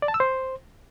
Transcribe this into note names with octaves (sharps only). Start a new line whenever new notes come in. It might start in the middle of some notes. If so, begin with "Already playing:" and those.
D5
A5
E6
C5